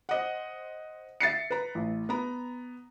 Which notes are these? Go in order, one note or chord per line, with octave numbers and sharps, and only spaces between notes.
C5 D#5 F#5
E5 A6 C7 C#7
B4 A#5
A1
B3 A#5